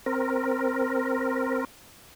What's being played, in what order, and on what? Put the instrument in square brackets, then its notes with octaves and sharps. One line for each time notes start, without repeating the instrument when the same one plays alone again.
[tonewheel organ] C4 A#4